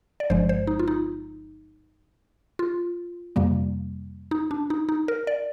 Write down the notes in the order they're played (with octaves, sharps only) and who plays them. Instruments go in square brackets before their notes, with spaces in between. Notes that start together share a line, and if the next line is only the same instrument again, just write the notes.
[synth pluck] D5
G1 G2 F3 G#3 C5
C5
D#4
F4
D#4
F4
F2 C3 G3 A#3
D#4
D4
D#4
D#4
A#4
D5